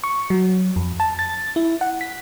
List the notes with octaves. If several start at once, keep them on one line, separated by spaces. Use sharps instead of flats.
C#6
F#3
F2
A5
A6
E4
F#5
B6